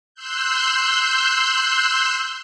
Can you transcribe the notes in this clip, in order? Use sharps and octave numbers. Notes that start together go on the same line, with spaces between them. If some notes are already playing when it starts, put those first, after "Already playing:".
C6 E6 F#6 G6